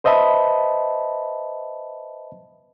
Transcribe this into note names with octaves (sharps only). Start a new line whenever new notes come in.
B4 C5 D#5 E5 A5 B5